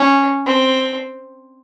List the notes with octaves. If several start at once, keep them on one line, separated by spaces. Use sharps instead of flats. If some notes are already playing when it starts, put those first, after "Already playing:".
Already playing: C#4
C4